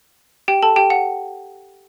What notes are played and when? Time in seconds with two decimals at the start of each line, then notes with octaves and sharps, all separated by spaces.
0.48 G4 G5
0.62 A4 A5
0.76 G4 G5
0.90 F#5